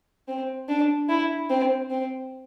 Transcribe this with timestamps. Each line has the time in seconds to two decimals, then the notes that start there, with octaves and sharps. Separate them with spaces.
0.28 C4
0.69 D4
1.09 E4
1.50 C4
1.91 C4